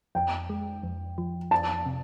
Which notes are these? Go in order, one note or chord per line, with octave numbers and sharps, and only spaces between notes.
F2 G5
G#3
F2
F3
F2 A5
C3